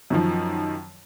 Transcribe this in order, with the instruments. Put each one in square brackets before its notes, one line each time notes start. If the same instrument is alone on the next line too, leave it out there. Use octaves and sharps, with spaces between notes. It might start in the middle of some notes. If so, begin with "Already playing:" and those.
[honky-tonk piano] F#2 D#3 F3